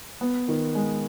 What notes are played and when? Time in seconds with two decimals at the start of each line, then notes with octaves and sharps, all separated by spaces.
0.21 B3
0.48 D#3
0.75 G#3